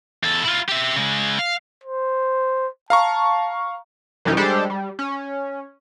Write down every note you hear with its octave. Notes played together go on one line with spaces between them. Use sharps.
E2 A4
E4 F4
G4 E5
C#3 G#3
F5
C5
F5 A5 A#5 C#6
F#2 C3 E3 G3 C#4 D#4
G3 G#3 D4 G4 A4 C5
G3
C#4